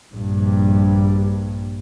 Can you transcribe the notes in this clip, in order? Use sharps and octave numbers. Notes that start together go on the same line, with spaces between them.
A#1 G2